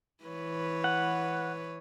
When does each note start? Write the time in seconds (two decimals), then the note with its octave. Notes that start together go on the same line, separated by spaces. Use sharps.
0.25 E3 B4 C#5
0.84 F#5